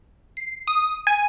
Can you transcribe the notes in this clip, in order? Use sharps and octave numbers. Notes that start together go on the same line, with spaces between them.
C7
D#6
G#5